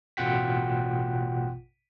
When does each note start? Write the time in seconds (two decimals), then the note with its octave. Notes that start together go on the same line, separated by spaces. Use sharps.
0.17 A1 B2 F4 F#5 G5 B6